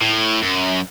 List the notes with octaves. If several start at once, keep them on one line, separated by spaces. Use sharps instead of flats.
A2
F#2